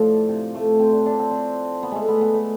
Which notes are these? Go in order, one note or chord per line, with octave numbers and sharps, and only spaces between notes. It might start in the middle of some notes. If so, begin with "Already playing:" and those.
Already playing: A2 F3 D4
C3
A3
C4
D4
D4
C4
C4
B3
G#3 A3
B3
B3
A3